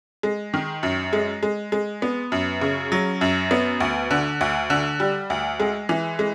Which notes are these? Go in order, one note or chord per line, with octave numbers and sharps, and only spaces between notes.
G#3
D#3
F#2
G#3
G#3
G#3
B3
F#2
C#3
F#3
F#2
B3
D2
D3
D2
D3
G3
D2
G#3
E3
G#3